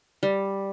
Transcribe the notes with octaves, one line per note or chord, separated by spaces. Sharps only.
G3